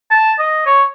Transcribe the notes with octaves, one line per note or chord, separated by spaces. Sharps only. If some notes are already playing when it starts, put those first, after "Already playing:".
A5
D#5
C#5